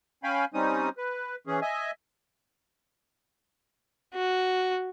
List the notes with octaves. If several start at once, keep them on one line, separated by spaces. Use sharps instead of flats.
C#4 F5 G5 G#5 B5
G3 C4 C#4 D#4 D#6
B4
E3 C#4 G#4
D#5 E5 G#5
F#4